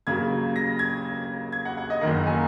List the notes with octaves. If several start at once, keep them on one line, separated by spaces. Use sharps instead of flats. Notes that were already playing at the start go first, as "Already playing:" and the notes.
D#2 C#3 F#3 A#3 G#6
A#6
G#6
G#6
F#5
F#5
D#5
F#1 F#2 D#3 A#3 F#5
G#5